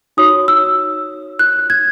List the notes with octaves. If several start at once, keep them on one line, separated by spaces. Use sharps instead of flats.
D#4 F#4 C#5 D#6
E6
F#6
G#6